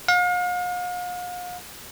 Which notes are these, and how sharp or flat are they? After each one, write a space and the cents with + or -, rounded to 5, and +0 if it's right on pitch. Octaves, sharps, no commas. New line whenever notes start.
F5 +40